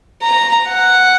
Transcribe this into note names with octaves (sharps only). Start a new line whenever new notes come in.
A#5
F#5